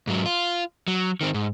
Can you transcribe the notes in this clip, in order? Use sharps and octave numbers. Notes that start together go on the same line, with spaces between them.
G#2 F#3
F4
F#3
D#3 C4
G#2